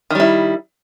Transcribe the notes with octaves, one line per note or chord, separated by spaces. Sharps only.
D#3 G3 E4